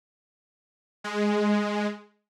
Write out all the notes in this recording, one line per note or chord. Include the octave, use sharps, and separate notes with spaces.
G#3